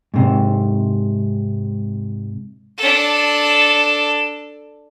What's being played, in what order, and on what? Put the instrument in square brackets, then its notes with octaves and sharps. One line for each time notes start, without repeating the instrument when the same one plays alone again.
[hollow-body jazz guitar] G#2 C3
[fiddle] D4 A4